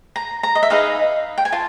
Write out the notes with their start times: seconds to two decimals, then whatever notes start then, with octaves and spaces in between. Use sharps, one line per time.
0.16 A#5
0.43 A#5
0.55 D#5
0.63 E5
0.70 D#4 G#4 B4 D#5 F5
1.38 G5
1.45 G#5
1.52 F4 A5